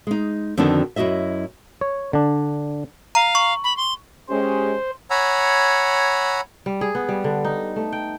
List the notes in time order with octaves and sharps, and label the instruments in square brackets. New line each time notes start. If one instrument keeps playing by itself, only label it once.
[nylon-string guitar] G#3 D#4
F2 D3 D#3 B3 D4 F#4
F#2 E4 F#4 D#5 E5
[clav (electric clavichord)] C#5
D3 D4
[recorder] F5 [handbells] A#5
[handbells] C#6
[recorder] B5
C6
[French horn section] G#3 C#4 G4 [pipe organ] C5
[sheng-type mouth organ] C#5 F#5 G#5 A#5 B5 E6
[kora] G3
G#4
B3
G3
D3
D#4
A3
G5